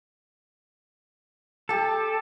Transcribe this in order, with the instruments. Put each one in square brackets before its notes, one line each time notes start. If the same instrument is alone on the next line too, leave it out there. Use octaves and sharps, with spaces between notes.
[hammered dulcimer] G4 A5 [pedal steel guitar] A4